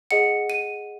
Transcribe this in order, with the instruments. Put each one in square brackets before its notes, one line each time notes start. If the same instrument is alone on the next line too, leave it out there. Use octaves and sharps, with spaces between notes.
[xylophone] G#4 D#5 F#5 C#7
D#7